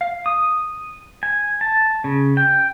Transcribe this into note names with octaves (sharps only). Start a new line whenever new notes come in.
F5
D#6
G#5
A5
C#3
G5